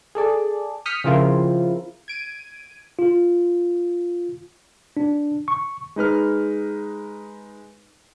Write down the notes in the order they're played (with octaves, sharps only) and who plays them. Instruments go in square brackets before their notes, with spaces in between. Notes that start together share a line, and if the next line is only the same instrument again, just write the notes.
[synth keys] G#4 A4 D5
D#6 F6 G6 B6 C#7
C#3 F3 C4 E4 F4 A#4
G#6 D7 D#7
[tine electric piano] F4
D4
C#6
[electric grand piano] G#3 D#4 B4 F6